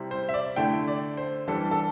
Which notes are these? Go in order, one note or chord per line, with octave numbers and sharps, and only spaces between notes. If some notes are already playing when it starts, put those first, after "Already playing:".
Already playing: C3 G3 C4 E4
C5
E5
D5
D3 A3 E4 G5
D5
C5
E3 G3 D4 A4
A4